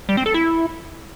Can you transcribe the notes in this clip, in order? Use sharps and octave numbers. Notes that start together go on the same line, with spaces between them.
G3
C4
A4
E4